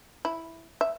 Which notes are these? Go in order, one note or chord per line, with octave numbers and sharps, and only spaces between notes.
E4
E5